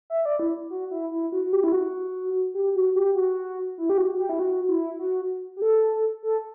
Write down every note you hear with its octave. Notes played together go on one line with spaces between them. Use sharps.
E5
D5
E4
F#4
E4
E4
F#4
F#4
G4
E4
F#4
G4
F#4
G4
F#4
E4
G4
F#4
G4
E4
F#4
E4
F#4
G4
A4
A4